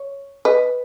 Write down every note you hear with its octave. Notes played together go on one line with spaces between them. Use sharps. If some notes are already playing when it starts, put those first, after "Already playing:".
Already playing: C#5
B4 D#5